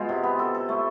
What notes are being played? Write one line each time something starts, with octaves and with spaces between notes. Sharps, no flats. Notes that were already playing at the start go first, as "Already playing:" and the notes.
Already playing: B2 G#3 F4
C3
B3
A4
A4
A3